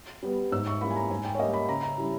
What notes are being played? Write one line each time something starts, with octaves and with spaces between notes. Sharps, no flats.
G3 B3
G#2 E6
C#6
G3 A#3 E4 B5
G#5
A#5
G#2 G#5
G5
C#5
G3 A#3 D#5
B5
C#3 A#5
A#5
G3 C#4 E4